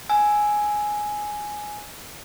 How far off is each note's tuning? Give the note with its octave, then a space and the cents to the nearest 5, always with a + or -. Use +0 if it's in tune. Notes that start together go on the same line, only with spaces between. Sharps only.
G#5 +5 E6 +0